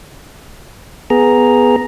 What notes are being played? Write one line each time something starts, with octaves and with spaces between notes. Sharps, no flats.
B3 G#4 A#5